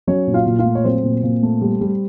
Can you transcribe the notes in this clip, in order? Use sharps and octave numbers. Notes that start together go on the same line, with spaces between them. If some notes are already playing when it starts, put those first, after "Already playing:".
F#3 C#4 C#5
A#2
F4 F5
A#2
F4 F5
A3
C#5
F#3 C4 C5
A#2
A#2
A3
G3
G3